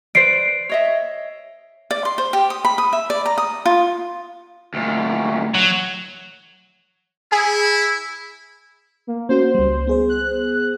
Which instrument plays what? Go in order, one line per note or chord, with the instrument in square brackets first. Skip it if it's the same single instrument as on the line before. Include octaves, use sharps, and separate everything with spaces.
[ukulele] B4 C5 D5 [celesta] C7 D7
[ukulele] C#5 D#5 E5
[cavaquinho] D5
C6
C5
G4
D#6
B5
D#6
E5
D5
A#5
D#6
F4
[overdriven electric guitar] D2 A#2
[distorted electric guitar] F#3
[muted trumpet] E4 [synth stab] G#4
[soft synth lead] A#3
[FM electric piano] A#3 C#4 F#4 [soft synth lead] C5
[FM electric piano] C#2 G3
B3 G#4 C5
[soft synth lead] F#6